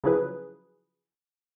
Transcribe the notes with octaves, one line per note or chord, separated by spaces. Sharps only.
C#3 F3 F#3 E4 G#4 B4